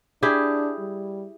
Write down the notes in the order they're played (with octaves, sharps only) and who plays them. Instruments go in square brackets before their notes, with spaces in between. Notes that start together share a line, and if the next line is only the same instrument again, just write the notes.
[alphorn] D4 [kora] E4 G4 G#4
[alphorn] G3